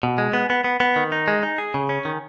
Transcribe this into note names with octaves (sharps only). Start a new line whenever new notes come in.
B2
G#3
B3
B3
B3
B3
D#3
D#4
G#3
D#4
G#4
C#3
C#4
D#3